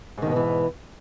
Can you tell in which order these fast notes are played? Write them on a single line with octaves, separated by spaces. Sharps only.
G#2 D#3 B2 B3 E3